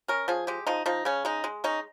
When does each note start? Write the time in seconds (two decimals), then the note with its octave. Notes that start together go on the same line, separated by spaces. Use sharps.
0.08 C#4 A#4
0.28 F3 G#4
0.47 G#3 G4
0.67 F3 D#4
0.86 F3 D#4
1.05 C#3 C#4
1.25 G#3 D#4
1.44 G#3
1.64 C#4 D#4